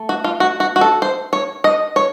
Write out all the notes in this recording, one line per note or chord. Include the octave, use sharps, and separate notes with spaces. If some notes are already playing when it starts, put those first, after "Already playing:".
Already playing: A3
F#4
F4
F#4
F#4
F#4
A4
C5
C#5
D#5
C#5